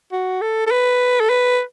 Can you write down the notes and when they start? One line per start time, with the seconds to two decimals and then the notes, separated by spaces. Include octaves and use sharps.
0.12 F#4
0.41 A4
0.66 A4
0.71 B4
1.20 A4
1.30 B4